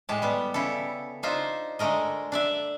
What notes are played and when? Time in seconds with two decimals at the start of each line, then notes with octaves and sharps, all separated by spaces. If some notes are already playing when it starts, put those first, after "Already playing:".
0.09 A2 G#3 G4 A5
0.22 G3 B3
0.54 C#3 E4 G4 A4
1.23 D4 D#4 F4 C5 E5
1.79 D3 G#3 A3 A#4 D#5
2.32 D4 D5 E5